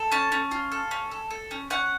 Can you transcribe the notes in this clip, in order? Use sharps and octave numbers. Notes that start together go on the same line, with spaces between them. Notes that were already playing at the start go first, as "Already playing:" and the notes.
Already playing: A4
C#4 A5
C#4
F4
A4
C#4
A4
A4
C#4
C#4 F#5